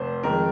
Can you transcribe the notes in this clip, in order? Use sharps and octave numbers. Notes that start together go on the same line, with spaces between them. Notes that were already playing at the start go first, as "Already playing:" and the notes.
Already playing: F1 F2 C5
F2 D#3 G#3 A#4